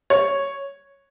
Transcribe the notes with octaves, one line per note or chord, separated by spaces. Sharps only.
C#5